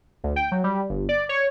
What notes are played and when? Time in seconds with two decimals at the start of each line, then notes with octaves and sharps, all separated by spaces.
0.24 D2
0.36 G5
0.52 F#3
0.64 G3
0.90 G1
1.09 D5
1.29 C#5